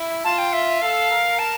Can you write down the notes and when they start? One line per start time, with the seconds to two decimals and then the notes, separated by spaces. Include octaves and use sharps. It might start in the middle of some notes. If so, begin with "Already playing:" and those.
Already playing: E4
0.24 F4 A5
0.38 G5
0.53 E5
0.81 A4 F5
1.11 A#4
1.39 A5